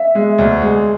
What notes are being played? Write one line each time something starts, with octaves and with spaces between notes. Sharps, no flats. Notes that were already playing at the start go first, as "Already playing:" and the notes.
Already playing: E5
G#3
D2
G#3